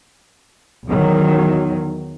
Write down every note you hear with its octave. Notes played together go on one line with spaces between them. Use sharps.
E2 D#3 F#3